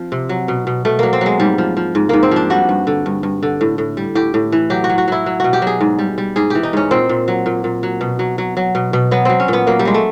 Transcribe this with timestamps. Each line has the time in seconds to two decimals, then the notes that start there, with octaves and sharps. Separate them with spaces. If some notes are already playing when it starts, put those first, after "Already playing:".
Already playing: F3 C4
0.12 C3
0.29 F#3
0.48 B2
0.67 B2
0.85 B2 A3
0.99 F#3 A#3
1.13 C4
1.21 F#3 G#3
1.40 G#2 G3
1.58 F3
1.77 F3
1.95 G#2
2.09 G#2 A#3
2.23 C4
2.31 F3 D4
2.50 G3 F#4
2.69 G2
2.87 D3
3.06 G2
3.23 G2
3.43 D3
3.61 A2
3.78 A2
3.97 G3
4.15 A2 G4
4.34 A2
4.52 E3
4.70 F#3 G4
4.84 F#4
4.90 F#3
4.98 F#4
5.08 F#3 E4
5.26 F#3
5.40 B2 F#4
5.53 G4
5.62 F#3 G#4
5.81 G#2
5.99 G3
6.18 G3
6.36 G#2 G#4
6.50 E3 G4
6.63 D#4
6.73 G#2 C#4
6.91 A#2 C4
7.09 A#2
7.28 F#3
7.46 A#2
7.64 A#2
7.83 F#3
8.01 B2
8.19 F#3
8.38 F#3
8.57 F#3
8.75 B2
8.93 B2
9.11 F#3 B3
9.25 F#3 C4
9.40 C#4
9.48 A#2 B3
9.67 F#3 A#3
9.79 G3
9.85 F#3 G#3
9.94 A3